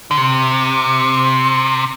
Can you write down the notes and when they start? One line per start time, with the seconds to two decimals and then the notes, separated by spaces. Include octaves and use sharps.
0.11 D3
0.17 C3